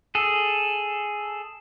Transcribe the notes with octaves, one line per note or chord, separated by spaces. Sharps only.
G#4 A4